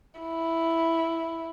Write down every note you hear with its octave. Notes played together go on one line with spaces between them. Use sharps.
E4